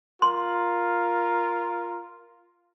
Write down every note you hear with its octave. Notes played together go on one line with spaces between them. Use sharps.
F4 A#4 C6